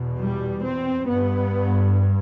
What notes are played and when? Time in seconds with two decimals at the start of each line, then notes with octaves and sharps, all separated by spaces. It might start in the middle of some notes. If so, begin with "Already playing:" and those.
Already playing: E2 B2
0.20 G3
0.64 C4
1.07 G2 B3